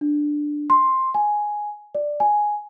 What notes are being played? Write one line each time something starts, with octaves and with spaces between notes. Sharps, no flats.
D4
C6
G#5
D5
G#5